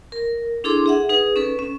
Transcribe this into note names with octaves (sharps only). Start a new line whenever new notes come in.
A#4
D4 E4 G#4 A4 C6 D6
G#4 E5 F#5
D#4 G#4 B4
C#4 A4 B4
C#4